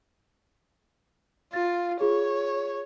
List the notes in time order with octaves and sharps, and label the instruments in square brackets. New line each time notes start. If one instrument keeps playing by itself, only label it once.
[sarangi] F4 [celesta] A6
[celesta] F4 G#4 [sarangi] C#5